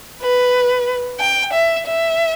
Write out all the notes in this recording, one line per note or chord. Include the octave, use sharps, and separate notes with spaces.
B4
G5
E5
E5